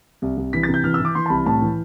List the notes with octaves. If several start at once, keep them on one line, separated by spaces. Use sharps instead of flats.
C2
C2
E3 B6
A6
C3
G6
E3 F6
E6
E3
D6
E3 C6
A5
C2 B5
A2 A5
E3